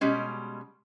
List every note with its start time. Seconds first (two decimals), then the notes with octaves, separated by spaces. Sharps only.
0.01 B2 G3 G#3 C#4